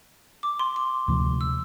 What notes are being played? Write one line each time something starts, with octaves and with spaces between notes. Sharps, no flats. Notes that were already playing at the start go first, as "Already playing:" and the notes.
D6
C6
D6
D2 C3 F3
E6